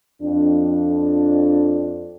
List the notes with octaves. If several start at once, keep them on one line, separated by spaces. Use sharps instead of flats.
F2 D4